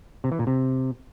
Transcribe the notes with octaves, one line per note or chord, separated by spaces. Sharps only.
C3
E3
A#2
C3